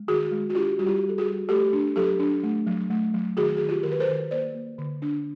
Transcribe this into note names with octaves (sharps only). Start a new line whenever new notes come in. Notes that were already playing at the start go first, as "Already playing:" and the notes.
Already playing: G#3
D#3 F#4 G#4
G#3
F#4
D4 F4 G4
G3 F#4
F4 G4
G3
A4
F#4 G#4
G3
A3 G4 A4
D4
F#3 G4 A4
D4
A3
F#3
A3
F#3
D#3 F#4 G#4
D#3 G#4
F4 G4
D#3 A#4
B4
A#4 C5
D#3
A#3 C5 D5
A#3
D3
D4